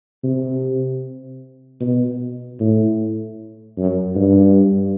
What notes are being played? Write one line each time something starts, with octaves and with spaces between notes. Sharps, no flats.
C3
B2
A2
F#2
G2